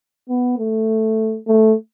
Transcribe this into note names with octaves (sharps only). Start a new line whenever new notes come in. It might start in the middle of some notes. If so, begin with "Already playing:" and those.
B3
A3
A3